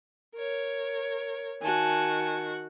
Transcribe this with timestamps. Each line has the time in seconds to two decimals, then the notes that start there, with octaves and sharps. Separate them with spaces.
0.35 A#4 C#5
1.62 D#3 F#4 G#5 A5